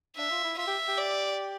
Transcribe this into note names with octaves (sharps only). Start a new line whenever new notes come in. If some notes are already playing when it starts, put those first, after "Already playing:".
D4 E5
F4
E4
F4 E5
G4
G4
D5